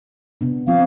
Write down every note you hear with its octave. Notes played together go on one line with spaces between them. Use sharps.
C3 B3 D4
F3 C4 F4 F5